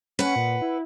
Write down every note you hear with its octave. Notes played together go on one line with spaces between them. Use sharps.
C#4 B4 F#5
A#2
E4